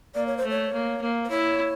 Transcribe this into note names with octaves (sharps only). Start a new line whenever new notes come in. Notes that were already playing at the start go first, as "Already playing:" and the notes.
A#3 D5
C#5
C5
A3
C#5
A#3
A#3
C5
E4 C#5